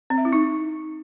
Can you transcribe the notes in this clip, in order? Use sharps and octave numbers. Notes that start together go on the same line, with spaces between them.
C4
E5
E4
D#4